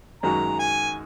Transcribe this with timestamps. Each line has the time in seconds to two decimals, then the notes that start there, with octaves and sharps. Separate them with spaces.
0.23 F#2 D#3 G#3 F#4 A#5
0.59 G#5